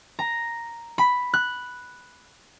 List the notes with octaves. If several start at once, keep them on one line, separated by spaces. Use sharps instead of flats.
A#5
B5
F#6